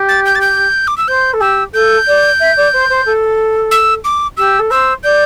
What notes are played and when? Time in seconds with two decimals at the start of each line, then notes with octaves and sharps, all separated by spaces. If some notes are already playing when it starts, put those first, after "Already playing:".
Already playing: G4
0.09 A6
0.25 G6
0.35 A6
0.41 G6
0.87 D6
0.97 E6
1.08 C5 G6
1.33 A4
1.40 G4 E6
1.73 A4 G6
2.07 D5
2.39 E5
2.56 D5
2.73 C5
2.89 C5
3.05 A4
3.71 E6
4.04 D6
4.37 G4 E6
4.59 A4
4.70 C5 E6
5.03 D5 G6